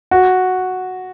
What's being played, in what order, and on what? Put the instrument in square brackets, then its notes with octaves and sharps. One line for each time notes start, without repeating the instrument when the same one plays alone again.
[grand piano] F#4